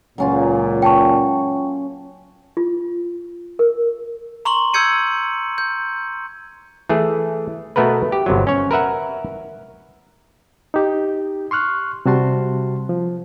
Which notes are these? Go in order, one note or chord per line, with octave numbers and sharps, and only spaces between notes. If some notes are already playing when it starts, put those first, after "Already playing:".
C#2 A#2 F#3 C#4 F4
G5 A5 C#6
F4
A#4
A#5 C6 C#6 F#7
E6 G6 G#6 C#7 D#7
G6
E3 A3 G#4
B2 A3 B3 A#4 B4
G4
G1 C3 F#3
C#4 C#5
A#4 B4 E5 F#5
D#4 G4
C6 C#6 F6 F#6
C3 G3 F#4 A5 C6
F3